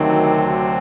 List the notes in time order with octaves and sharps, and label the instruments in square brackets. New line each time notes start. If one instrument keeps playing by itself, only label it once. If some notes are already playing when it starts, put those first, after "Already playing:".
Already playing: [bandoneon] D2 C3 F#3 C4 [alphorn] D#3